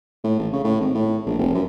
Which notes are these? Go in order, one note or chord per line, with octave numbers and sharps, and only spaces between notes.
A2
A1
C#3
A2
G#1
A2
A#1
F1
F#2